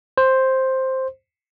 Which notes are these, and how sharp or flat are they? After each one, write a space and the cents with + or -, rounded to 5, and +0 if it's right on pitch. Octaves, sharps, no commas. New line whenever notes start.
C5 +5